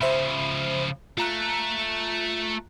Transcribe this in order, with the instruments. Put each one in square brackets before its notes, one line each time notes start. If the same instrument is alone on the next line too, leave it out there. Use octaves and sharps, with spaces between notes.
[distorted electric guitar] C#3 F3 [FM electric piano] C5 E5 B5
[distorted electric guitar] A3 [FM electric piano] F4 A#5 F#6